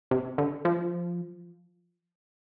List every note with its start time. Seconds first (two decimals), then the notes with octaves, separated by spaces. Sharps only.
0.11 C3
0.38 D3
0.65 F3